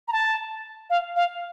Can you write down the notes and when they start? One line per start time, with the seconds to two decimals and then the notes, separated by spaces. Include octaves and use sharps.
0.08 A#5
0.12 A5
0.90 F5
1.16 F5